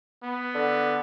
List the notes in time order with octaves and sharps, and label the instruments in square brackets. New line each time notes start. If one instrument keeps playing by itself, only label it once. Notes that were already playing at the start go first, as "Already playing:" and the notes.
[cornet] B3
[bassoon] D3